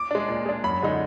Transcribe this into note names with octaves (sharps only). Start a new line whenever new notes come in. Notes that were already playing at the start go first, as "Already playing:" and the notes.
Already playing: D6
G#3 D4
A#2
G#3 D4
F#2 B5
D3 G#3 D#4